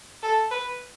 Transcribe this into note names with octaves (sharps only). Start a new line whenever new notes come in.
A4
B4